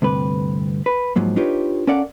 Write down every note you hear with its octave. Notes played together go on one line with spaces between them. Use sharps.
D2 G2 C3 B4
B4
G#2 F3 F#3 A#3
D4 D#4 F4 G4 B4 C#5
C#4 A4 A#4 D5 F5 F#5